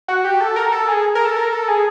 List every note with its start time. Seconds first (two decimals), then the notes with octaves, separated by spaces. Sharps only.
0.08 F#4
0.24 G4
0.41 A4
0.56 A#4
0.72 A4
0.88 G#4
1.15 A#4
1.25 A4
1.36 A#4
1.53 A4
1.68 G#4